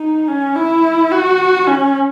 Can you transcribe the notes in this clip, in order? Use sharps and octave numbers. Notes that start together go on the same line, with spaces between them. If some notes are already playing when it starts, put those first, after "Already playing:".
Already playing: D#4
C#4
E4
F#4
C#4